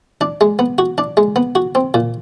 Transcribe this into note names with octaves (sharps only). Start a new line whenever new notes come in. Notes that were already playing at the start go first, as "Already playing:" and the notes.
D4
G#3
B3
F#4
D4
G#3
B3
F#4
C4
A#2